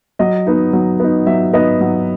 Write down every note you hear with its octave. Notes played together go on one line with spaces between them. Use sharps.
F#3 D#5
B3 D#4
F#3
B3 D#4
F#3 E5
B3 D#4 D#5
F#3